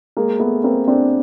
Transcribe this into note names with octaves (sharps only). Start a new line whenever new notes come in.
G#3 A#3
A3 B3
A#3 C4
C4 D4